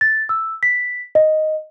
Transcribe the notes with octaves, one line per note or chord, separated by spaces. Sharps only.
A6
E6
B6
D#5